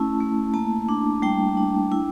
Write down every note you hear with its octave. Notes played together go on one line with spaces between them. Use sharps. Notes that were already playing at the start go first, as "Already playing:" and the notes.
Already playing: A3 C#4 E4 A5
A3
A#3 A5
D4
G3 G5
D4
E4